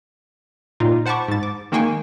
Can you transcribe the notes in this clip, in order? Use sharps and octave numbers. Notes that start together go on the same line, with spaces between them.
A#2 D#4 F4
C5 F#5 A5 B5 C#6 D6
G#2 A6
D6
D#3 G#3 A#3 G5 G#5 C#6